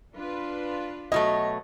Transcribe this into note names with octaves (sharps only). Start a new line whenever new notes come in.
D4 F4 B4
B2 F#3 A3 D#5